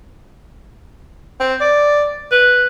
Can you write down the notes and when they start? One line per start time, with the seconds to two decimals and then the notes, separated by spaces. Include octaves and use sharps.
1.40 C4
1.61 D5
2.32 B4